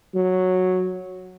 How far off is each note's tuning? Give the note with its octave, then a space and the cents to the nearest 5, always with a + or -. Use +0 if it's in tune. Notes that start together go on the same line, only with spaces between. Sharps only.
F#3 -5